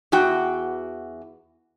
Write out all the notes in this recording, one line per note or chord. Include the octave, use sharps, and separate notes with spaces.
E2 E3 F#4 G5